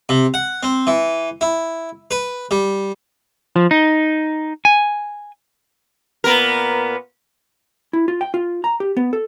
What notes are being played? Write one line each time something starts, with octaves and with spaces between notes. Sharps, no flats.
C3
F#5
C4
E3
E4
B4
G3
F3
D#4
G#5
A#2 B3 A#4
E4
F4
G5
F4
A#5
G4
B3
A4